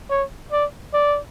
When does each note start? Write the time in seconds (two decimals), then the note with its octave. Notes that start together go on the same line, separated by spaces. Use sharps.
0.10 C#5
0.52 D5
0.94 D5